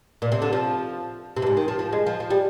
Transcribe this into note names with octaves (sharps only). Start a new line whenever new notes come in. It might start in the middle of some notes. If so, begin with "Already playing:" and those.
A#2
C3
D3
F3
C3
G2
G#2
D#3
F3
F3
G#3
F3
F3
G3